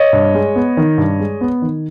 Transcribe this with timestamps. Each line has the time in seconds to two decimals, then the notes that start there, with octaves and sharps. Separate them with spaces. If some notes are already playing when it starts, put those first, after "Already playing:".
Already playing: C#5 D#5
0.13 G2
0.34 G#3
0.56 B3
0.77 D#3
0.98 G2
1.20 G#3
1.41 B3
1.62 D#3